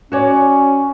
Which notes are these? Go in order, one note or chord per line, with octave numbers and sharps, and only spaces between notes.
C#4 F#4 C#5 D5